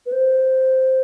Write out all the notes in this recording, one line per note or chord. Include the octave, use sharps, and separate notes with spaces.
B4
C5